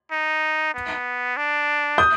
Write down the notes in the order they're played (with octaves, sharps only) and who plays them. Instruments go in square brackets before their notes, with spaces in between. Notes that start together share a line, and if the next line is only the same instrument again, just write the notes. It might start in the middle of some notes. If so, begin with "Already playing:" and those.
[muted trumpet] D#4
B3
D4
[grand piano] D#6 G6